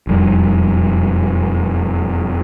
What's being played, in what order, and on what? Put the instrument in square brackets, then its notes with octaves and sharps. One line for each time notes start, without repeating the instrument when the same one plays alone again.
[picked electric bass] E1 F2 G3